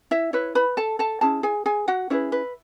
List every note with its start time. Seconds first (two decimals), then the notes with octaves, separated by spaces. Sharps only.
0.11 E4 E5
0.33 E4 B4 C#5
0.55 B4 B5
0.77 A4 A5
0.99 A4 A5
1.21 C#4 E4 G#4 A5
1.43 G#4 G#5
1.66 G#4 G#5
1.88 F#4 F#5
2.10 C#4 E4 G#4 B4 C#5
2.32 B4